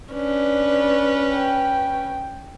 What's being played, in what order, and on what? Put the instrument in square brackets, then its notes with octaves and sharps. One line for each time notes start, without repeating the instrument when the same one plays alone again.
[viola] C#4 B4 [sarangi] D4
[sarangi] G5